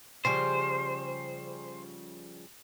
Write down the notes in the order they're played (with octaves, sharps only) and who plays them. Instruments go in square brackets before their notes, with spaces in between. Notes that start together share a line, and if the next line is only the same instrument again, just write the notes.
[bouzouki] C#3 F3 G3 [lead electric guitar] C5